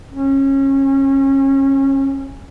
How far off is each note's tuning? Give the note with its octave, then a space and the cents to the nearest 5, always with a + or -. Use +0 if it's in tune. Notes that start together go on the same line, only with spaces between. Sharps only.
C#4 -25